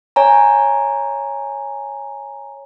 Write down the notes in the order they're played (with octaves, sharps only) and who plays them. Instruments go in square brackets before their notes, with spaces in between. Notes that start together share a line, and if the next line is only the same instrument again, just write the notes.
[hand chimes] C#5 G#5 A#5